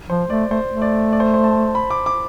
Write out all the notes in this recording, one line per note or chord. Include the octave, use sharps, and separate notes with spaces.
F3 C5
A3 D5
A3 C5
A3
D5
D5
C5
C5
A5
B5
D6
D6